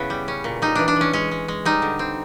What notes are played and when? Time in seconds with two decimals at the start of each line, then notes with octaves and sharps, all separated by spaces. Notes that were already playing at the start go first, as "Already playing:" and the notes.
Already playing: C#3 B3 E4
0.10 G3
0.28 C#4
0.44 A#2
0.62 G3 D#4
0.75 E3 D4
0.88 D4
0.96 E3 C#4
1.13 G#3 C#4
1.31 G#3
1.48 G#3
1.65 G3 D#4
1.82 D3
1.99 C4